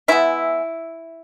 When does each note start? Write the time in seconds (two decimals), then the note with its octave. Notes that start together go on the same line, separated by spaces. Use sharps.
0.08 E3 G#3 B3 E4 E5